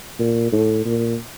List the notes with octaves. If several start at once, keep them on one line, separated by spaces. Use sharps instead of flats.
A#2
A2
A#2